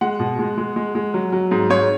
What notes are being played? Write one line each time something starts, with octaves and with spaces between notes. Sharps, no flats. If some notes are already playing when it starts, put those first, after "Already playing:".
G#3 F#5
B2
G#3
G#3
G#3
G#3
F#3
F#3
G#2
G#2 C#5